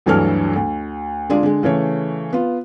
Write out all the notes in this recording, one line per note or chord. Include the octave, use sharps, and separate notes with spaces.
D2 G2 E3 F#3 A4 F6
D2
D3 G#3 D4 F4 G#4
D3 G#3
C#3 E3 A3 C#5
B3 F4